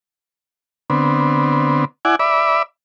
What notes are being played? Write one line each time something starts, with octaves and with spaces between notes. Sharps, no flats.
D3 B3 C4
E4 D5 F#5 G#5
D5 E5 B5